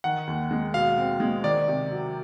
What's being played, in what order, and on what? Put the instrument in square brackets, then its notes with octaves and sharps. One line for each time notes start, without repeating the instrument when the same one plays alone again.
[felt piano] D#3 [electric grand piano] F#5
[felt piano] D#2
G#3
[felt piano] B2 [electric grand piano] F5
[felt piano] C4
G#3
[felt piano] D#3 [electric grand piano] D5
[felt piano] C3
F#3